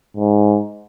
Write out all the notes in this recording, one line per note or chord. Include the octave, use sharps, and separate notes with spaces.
G#2